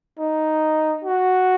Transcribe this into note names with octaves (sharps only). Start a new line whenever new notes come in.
D#4
F#4